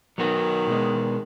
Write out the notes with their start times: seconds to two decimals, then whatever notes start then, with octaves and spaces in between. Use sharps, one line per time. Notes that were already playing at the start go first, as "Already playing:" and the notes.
0.18 D#3 F#3 B3 F#4
0.67 B2 G#3 B3